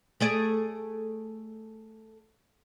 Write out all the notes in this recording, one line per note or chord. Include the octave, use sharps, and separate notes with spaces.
A3 G#4 D5